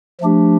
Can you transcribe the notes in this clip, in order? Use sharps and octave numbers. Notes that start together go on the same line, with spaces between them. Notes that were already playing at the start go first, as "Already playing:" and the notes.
F3 A3 D4 G4